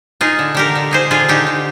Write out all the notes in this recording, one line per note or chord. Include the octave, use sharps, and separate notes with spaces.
D#4 F4 G#4
D3
D3 G4 A#4
D3
D#4 G#4 C5
D3 F4 G#4
D3 D#4 G4
D3